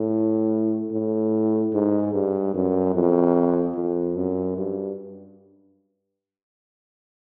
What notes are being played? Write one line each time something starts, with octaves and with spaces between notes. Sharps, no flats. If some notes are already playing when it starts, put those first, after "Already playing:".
Already playing: A2
A2
G#2
G2
F#2
F2
F2
F#2
G2